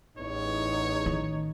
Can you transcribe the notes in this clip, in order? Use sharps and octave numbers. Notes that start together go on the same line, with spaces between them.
A1 E2 D#4 C#5
D#3